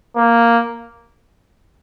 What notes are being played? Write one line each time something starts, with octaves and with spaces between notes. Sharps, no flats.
A#3